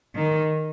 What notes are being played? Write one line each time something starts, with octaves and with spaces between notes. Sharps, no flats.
D#3